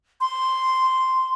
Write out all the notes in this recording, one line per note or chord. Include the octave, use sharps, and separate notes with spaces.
C6